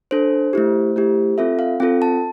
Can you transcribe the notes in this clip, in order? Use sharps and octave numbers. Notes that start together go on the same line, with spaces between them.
D4 A4 C5
A3 E4 G4
A3 E4 G4
C4 F4 A4 E5
F5
C4 F4 A4 G5
A5